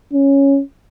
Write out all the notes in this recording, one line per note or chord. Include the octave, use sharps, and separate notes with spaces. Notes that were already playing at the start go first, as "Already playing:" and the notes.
C#4